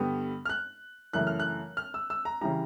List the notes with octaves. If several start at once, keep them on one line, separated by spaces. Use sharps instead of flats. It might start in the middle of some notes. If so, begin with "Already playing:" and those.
Already playing: G2 D3 G3 B3
F6
F#6
F#2 C#3 E3 A3 F#6
F6
F#6
F6
E6
E6
A#5
C#3 E3 G3 A#5